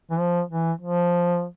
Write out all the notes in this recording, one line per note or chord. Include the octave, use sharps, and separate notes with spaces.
E3
F3
E3
F3